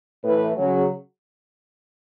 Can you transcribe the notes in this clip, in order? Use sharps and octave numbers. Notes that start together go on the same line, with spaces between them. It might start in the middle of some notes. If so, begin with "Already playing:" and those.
A2 E3 B4
C#3 F#3